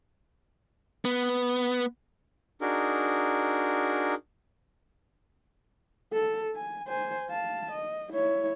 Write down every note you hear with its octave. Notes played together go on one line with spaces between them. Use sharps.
B3
D4 D#4 F#4 G#4 A#4
A4
G#5
C5 G#5
F5 A5
D#5
E4 C#5